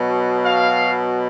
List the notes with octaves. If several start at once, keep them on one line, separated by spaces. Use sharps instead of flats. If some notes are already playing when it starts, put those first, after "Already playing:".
Already playing: B2 F#3
F5